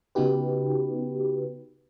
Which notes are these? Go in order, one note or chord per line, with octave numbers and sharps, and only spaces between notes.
C#3 B3 D#4 F#4 G4 B4